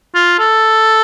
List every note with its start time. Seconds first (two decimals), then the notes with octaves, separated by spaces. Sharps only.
0.15 F4
0.39 A4